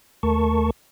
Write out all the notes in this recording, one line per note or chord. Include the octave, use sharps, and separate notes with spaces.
D#2 A3 A#4 A5 C#6